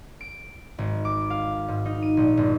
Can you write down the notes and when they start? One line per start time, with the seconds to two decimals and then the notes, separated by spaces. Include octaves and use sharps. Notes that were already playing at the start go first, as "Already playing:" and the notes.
0.21 D7
0.78 G#1
1.05 D6
1.30 F5
1.68 G#2
1.85 D#4
2.02 D#7
2.17 A#1
2.37 G1